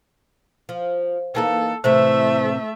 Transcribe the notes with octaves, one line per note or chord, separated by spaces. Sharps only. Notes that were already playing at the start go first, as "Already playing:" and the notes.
F3
E3 A#3 D#4 A4
A2 C3 E3 A3 C5 E5